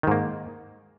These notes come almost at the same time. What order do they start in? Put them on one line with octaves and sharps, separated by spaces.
D#3 G#2 A#3